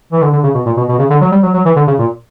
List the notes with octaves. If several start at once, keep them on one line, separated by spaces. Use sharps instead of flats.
E3
D3
D3
C#3
B2
A#2
B2
B2
C#3
D3
F#3
G3
F#3
F#3
E3
D3
C#3
A#2